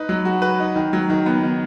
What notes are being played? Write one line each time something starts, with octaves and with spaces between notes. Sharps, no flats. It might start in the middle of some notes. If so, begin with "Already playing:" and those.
Already playing: D#4 B4
F#3
F#4
B4
D#4
D#3
F#3
D#3
B3
D#3